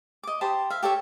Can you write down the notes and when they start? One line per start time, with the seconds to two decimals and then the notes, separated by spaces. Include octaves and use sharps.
0.23 D#5 D6
0.41 G4 C5 A5 B5
0.70 E5 F5
0.83 G4 A4 C#5 E5